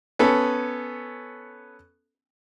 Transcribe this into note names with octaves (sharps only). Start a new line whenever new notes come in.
B3 C#4 A4